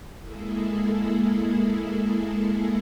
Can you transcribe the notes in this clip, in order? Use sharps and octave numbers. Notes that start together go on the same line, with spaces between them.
G#3 A#3 E4 G#4 A4